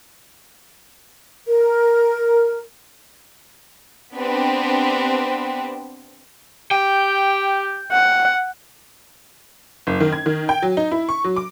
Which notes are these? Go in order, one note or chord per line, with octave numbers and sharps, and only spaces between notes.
A#4
B3 C4 D4 G4 B4
G4 G5
F#5
F#1
D#3
G#6
D#3
G5
F#3
D#4
E4
C#6
F#3
D6